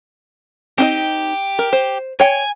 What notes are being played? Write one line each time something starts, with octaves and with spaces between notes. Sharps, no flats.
C4 D#4 G4 D#5
A#4
C5
C#5 G5 G#5